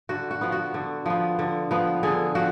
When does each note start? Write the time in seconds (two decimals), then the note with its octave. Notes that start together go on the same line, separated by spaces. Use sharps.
0.09 D3 F#4
0.31 F#4
0.41 F3 B3
0.52 F#4
0.74 D3
1.06 F3 B3
1.39 D3
1.71 F3 B3
2.03 D3 G#4
2.35 F3 F#4